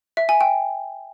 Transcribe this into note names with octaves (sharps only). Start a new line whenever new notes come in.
E5
G#5
G5